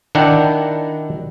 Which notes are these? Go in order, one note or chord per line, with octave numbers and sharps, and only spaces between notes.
D#3 D4 E4 F#5 G5 A#5